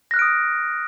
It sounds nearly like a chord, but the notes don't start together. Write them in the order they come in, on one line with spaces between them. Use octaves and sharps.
A#6 F#6 F6 D7 D#6